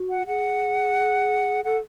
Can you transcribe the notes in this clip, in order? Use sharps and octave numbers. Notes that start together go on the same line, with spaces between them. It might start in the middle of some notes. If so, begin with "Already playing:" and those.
Already playing: F#4
F#5
G#4 F#5
A4 F#5